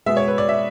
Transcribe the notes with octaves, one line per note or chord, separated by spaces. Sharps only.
B2 G#3 B3 E5
C#5
B4
D5
E5